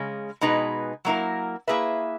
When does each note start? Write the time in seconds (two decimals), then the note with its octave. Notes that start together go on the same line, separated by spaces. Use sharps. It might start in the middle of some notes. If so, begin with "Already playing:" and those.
Already playing: C#3 G#3 C#4
0.41 B2 G#3 D#4 G#4 B4
1.05 F#3 A#3 E4 A#4
1.67 A#3 E4 G#4 B4 E5